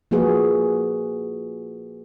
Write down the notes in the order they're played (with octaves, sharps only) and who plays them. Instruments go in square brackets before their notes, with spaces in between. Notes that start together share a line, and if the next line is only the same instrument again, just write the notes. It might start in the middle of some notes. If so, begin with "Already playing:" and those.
[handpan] F3 A#3 F#4 G#4 B4